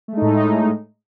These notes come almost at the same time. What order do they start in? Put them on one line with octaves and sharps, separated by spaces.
A3 G#3 D#4 A2